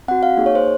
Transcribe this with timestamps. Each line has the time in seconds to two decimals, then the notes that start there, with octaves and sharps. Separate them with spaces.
0.08 C4 F#4 F#5
0.23 F5
0.37 A#3 D#4 G#4
0.46 C#5
0.55 C5